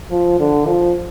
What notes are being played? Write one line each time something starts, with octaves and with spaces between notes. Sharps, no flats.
F3
D3
F3